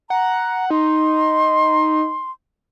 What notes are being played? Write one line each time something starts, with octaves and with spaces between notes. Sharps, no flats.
F#5 A#5
D#4 C6